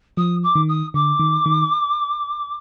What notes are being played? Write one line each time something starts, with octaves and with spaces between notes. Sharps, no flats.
F3 D#6
D6
D#3
D#6
D3 D6
D#3
D#3